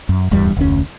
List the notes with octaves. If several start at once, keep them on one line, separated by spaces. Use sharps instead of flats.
F#2
D1 E2 G2 G3
F1 D2 C#4